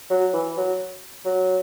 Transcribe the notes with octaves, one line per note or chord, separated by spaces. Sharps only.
F#3
E3
F#3
F#3